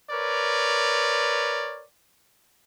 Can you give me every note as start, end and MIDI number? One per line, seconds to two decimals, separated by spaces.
0.10 1.84 70
0.10 1.84 71
0.10 1.84 73
0.10 1.84 74